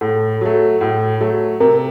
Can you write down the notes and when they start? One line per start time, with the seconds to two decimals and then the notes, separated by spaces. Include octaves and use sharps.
0.01 A2 A4
0.41 F#3 A3
0.81 A2
1.20 F#3 A3
1.60 C3 A#4